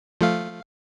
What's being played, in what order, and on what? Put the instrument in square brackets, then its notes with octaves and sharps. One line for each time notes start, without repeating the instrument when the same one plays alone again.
[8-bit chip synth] F3 A3 F5